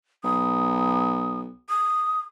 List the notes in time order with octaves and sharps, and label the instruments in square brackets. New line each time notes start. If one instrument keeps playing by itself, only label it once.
[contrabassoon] B1 [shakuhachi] D#6
[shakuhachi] D#6